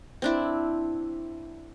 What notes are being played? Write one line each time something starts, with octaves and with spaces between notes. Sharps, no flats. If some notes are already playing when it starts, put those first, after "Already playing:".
C4 D4 E4